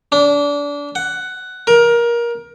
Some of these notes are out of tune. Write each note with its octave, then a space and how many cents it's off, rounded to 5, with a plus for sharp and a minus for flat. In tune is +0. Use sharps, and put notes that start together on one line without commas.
D4 -25
F#5 +10
A#4 +20